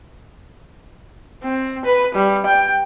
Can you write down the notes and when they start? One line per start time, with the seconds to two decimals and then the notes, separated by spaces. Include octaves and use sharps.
1.43 C4
1.85 B4
2.15 G3
2.46 G5